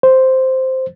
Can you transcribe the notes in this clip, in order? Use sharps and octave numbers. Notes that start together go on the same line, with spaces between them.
C5